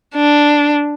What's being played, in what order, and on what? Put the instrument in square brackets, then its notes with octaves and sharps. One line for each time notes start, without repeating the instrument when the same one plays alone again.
[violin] D4